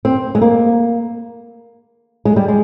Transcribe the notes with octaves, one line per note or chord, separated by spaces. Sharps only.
C4
G#3
A#3
G#3
G3
G#3